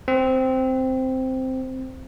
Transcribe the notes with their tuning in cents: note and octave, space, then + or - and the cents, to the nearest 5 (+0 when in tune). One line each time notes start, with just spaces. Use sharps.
C4 -5